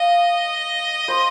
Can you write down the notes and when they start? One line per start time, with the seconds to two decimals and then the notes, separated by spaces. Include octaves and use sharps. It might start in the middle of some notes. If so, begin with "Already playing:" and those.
Already playing: D#5 F5
1.08 C5